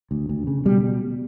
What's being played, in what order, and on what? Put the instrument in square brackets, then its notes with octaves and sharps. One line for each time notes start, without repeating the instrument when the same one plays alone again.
[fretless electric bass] D2
D2
C#3
B2 G3